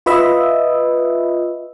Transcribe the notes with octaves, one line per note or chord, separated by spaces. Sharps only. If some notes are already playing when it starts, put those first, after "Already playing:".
F4 B4 D#5 E5